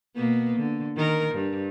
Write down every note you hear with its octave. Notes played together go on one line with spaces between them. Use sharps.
B2 A#3 B3
D3
D#3 A#4
G2